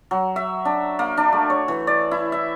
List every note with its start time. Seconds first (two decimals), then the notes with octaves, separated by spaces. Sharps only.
0.11 F#3
0.36 E5
0.65 D4
0.99 A#3
1.17 D4
1.33 A3
1.50 C#5
1.68 E3
1.87 D5
2.11 E4
2.32 E5